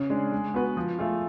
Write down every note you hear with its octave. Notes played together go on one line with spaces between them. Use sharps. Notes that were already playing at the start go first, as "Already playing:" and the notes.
Already playing: C#3
G#3 D4
G#3
B3 F#4 B4
F3
A3 F4 G#4